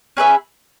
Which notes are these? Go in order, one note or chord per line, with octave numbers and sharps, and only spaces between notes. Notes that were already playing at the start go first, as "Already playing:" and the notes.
C#4 G#4 B4 E5